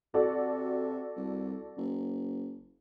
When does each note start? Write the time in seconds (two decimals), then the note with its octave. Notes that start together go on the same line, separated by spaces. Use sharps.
0.14 C3 F#4 A4 D5
1.16 C2
1.77 F#1